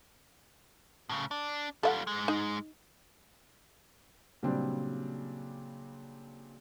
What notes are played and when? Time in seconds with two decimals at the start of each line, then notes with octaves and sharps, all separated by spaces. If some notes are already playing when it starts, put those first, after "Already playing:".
1.09 A2 C#3
1.31 D4
1.83 G3 F4 A4 E5 F#5
2.07 G#2 G#3
2.28 D#4
4.43 A#2 C#3 F#3 G3 C4 D4